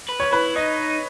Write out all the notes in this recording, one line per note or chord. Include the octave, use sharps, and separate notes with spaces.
B4
C#5
E4 B4
D#4 D#5